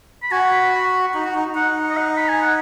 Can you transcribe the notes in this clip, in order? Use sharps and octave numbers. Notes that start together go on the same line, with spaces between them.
B5
F#4 G#5
B5
D#4
F#4
D#4
D#4 F#5
D#5
F#5
B5
G#5
F#5